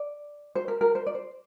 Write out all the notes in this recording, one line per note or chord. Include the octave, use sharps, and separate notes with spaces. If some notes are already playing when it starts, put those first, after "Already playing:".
Already playing: D5
C5
A#4
A#4
C5
D5
C5